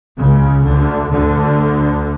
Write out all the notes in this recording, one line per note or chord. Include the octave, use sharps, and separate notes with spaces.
C#2 C#3
D2 D3
D2 D3